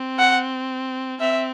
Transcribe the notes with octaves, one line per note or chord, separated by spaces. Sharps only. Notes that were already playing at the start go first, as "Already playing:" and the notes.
Already playing: C4
F#5
C4 E5